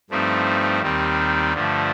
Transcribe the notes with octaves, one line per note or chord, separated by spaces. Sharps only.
G2 F3 A3 C4 D#4
D#2 D#3 G3 C4 D#4
G2 D3 F3 A3